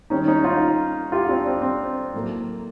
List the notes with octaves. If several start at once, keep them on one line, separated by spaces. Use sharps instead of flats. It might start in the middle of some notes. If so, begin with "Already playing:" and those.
D#3 G3 C4 C#4 D#4
C#4 D#4
D#4 F4
F4 G4
C4 D4
C4
C4
A2 F#3 A#3